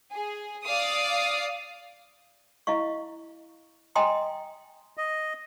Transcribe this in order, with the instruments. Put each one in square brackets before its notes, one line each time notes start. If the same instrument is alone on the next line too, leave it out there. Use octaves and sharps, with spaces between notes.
[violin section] G#4
D5 F5 D#6
[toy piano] E4 D#5 F5 C#6
D#5 G5 G#5 A#5 C6 D#6
[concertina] D#5